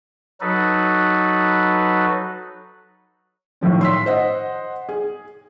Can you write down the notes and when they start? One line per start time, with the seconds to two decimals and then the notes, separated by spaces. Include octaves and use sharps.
0.41 F#3 D#4 F#4 A4 B4
3.61 A2 D#3 F3 C#4
3.81 C6 E6 B6
4.06 C5 D#5 F#5
4.89 G#4